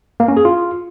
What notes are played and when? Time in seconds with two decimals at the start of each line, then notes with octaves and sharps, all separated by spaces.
0.20 A#3
0.28 C#4
0.37 G#4
0.45 F4